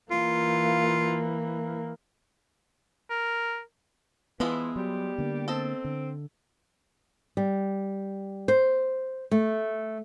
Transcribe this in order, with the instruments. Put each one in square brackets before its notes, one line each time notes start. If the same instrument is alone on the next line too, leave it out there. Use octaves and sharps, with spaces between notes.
[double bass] E3 A#3 [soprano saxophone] F4
[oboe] A#4
[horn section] E3 [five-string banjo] F3 G#3 E4 [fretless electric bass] B3
[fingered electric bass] F#3 [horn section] G3 G4
[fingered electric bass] D3 A#3
[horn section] C4 [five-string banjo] A4 D#5 A5
[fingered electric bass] D3
[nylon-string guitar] G3
C5
A3